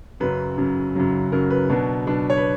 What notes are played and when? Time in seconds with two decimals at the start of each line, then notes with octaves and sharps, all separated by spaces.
0.20 F#2 C#3 F#3 B4
0.58 F#2 C#3 F#3
0.95 F#2 C#3 F#3
1.32 F#2 C#3 F#3 A#4
1.50 B4
1.70 B2 F#3 B3 D4
2.07 B2 F#3 B3 D4
2.30 C#5
2.37 B4